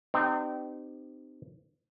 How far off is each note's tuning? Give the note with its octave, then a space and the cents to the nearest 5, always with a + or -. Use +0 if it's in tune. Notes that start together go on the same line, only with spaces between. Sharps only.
C4 -30 D#4 -40 G4 -5